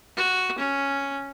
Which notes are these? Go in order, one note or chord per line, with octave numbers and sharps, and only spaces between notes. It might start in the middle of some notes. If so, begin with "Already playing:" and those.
F#4
C#4